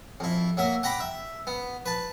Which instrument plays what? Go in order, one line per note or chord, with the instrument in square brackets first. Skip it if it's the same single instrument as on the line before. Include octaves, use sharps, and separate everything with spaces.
[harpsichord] F2 E4
F#3 A#3 E5
F#5 G5 A#5 B5 D6
E5
B3
B4 A5